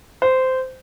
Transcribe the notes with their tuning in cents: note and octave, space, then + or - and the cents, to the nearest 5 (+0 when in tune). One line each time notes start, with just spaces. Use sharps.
C5 -15